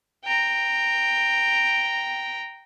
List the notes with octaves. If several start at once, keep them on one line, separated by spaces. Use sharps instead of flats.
G5 A#5